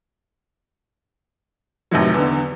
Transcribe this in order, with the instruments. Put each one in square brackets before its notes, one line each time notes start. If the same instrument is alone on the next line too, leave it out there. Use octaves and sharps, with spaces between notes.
[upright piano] A1 C3 D#3 F#3
E2 D3